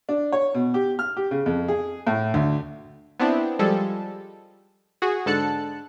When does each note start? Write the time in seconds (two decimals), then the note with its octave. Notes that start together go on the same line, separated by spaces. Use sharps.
0.09 D4
0.32 C#5
0.54 B2
0.74 G4
0.99 F6
1.17 G4
1.31 C#3
1.46 F2
1.68 G#4
2.07 A2
2.34 D2
3.19 B3 C4 D4 E4
3.59 F3 G3 G#3 A4
5.02 F#4 G#4
5.26 G#2 D3 A4 A5 F#6 C#7